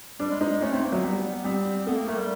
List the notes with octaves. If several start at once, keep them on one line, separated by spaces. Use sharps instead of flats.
G3 D4
G#3
G#3 D#4
G#3
A3 C#4
A3 C4
A#3
F#3 B3
G3
G3 C4
A3 B3
A#3
A3 A#3
G3